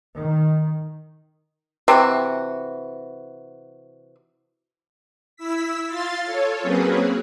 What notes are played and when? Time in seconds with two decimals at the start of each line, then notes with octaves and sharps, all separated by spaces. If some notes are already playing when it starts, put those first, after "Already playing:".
0.17 D#3
1.88 C3 E3 F#4
5.36 E4 E6 B6
5.87 F4 F5 C6 A6
6.23 F4 A4 C#5
6.62 F#3 A#3 C4 C#4 G#4 B4